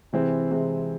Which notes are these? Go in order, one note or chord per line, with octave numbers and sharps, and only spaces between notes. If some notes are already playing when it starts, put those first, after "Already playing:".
C3 E3 G#3 C4
C3 E3 G#3 C4